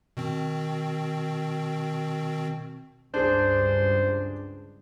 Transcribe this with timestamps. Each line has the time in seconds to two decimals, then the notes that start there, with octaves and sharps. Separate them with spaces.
0.17 B2 D#3 C4
3.14 C#2 G2 D4 G#4 C5